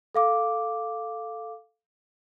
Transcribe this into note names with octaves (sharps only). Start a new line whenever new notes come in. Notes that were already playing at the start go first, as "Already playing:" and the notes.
A4 F5 D6